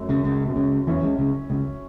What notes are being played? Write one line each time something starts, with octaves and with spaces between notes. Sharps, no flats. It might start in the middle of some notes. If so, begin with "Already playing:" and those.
Already playing: F#2 F#3 A3
C#2 C#3
C#2 C#3
B2
C#2 C#3
E2 E3 F#3 C#4 E4
C#2 C#3
C#2 C#3
C#2 C#3